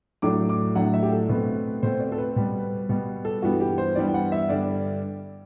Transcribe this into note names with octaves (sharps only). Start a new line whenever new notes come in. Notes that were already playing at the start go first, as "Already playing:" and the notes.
A2 F#3 A3 D4 D6
D6
A2 F#3 A3 D4 F#5
E5
G4
A4
B2 A3 C4 B4
B2 A3 C4 C5
D5
A4
B4
B2 G3 B3
B2 G3 B3
A4
G2 E3 G3 B3 F#4
G4
C5
G2 E3 G3 B3 D5
G5
F#5
E5
G2 D3 G3 D4 D5